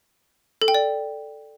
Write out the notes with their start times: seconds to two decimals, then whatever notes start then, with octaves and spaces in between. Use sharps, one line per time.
0.62 A4
0.68 G5
0.74 D5